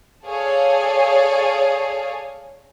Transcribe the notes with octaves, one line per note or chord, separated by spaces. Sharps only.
G#4 A4 C#5 D5 F5 G#5